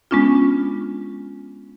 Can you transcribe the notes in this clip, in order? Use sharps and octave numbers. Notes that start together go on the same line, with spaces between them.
G#3 B3 C#4 D4 F4